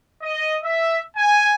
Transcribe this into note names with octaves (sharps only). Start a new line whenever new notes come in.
D#5
E5
G#5